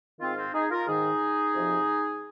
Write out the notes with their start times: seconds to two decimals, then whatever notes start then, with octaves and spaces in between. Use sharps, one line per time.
0.20 G#2 D#3 C4 F4
0.36 C4 F4
0.54 D#4 G#4
0.70 F4 A#4
0.87 G#2 D#3 D#4 G#4
1.54 F2 C3 F3